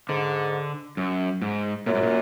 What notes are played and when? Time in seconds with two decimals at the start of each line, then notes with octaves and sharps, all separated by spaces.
0.09 G#2 D3
0.97 F#2
1.42 G#2
1.86 F#2 A#2
1.95 G#2
2.03 A#2